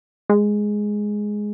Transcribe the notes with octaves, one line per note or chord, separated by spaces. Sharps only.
G#3